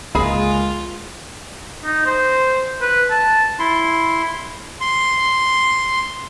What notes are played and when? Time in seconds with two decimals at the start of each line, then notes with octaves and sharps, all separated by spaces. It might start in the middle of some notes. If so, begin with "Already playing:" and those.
0.15 C#2 G#3 A#3 F4 G#4 F5 B5
1.85 D#4
2.06 C5
2.82 B4
3.11 A5
3.59 E4 C6
4.81 C6